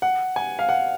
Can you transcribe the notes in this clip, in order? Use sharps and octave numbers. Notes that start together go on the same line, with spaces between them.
F#5
G#5
F5
F#5